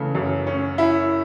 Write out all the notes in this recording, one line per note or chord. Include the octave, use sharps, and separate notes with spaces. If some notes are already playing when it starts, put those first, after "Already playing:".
Already playing: C#3 E3 A3
F#2
C#4
E4